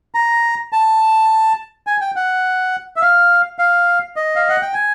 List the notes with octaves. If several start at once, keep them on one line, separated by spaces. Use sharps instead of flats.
A#5
A5
G#5
G5
F#5
E5
F5
F5
D#5
F5
F#5
G5
G#5